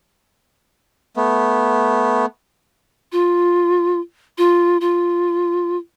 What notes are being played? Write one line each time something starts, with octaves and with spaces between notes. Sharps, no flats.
A3 B3
F4
F4
F4